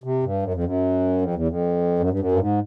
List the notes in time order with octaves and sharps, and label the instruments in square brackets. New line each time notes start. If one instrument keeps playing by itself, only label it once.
[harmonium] C3
G2
F#2
F2
F#2
F2
E2
F2
F#2
G2
F#2
G2
G#2